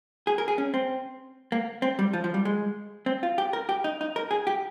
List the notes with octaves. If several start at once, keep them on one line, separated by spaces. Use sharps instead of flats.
G#4
A#4
G#4
C#4
C4
A#3
C4
G3
F3
F3
G3
G#3
C4
F4
G4
A#4
G4
D#4
D#4
A#4
G#4
G4